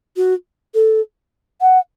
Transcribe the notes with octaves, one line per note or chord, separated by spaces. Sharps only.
F#4
A4
F#5